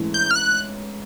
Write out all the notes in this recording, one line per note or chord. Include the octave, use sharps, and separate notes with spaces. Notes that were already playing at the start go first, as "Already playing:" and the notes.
Already playing: G#2 E3 A3 C#4 E4
G6
F6
F#6